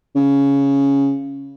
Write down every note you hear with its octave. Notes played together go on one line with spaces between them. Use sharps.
C#3